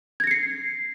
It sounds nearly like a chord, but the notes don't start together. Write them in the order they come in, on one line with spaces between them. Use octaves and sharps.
G#6 A#6 C#7 C7